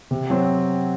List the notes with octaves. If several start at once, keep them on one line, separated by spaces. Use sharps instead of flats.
C3
F#3 C4